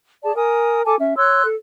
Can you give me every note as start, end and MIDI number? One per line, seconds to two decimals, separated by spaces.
0.23 0.33 68
0.23 0.33 74
0.23 0.33 81
0.35 0.81 70
0.35 0.81 80
0.35 0.81 87
0.84 0.95 69
0.84 0.95 80
0.84 0.95 81
0.84 0.95 86
0.98 1.17 61
0.98 1.17 76
1.17 1.44 73
1.17 1.44 84
1.17 1.44 88
1.17 1.44 90
1.45 1.55 69